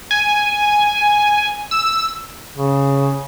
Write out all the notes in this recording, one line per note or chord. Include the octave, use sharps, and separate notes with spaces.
G#5
E6
C#3